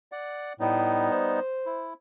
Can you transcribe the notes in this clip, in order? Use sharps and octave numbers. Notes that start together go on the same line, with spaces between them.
D5 F#5
A2 G3 B3 D#4
C5
E4